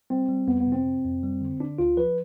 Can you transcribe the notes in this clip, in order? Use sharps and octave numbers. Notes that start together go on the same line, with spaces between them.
G3 C4
G3
F2 B3
B3
C3
C4
C3
F2
G3
D3
D3 D4
D2 F4
F3 B4